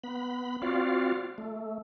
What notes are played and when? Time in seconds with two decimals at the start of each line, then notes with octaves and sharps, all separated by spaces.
0.04 B3 B5
0.62 C4 F4 F#4 D5 F5
1.38 A3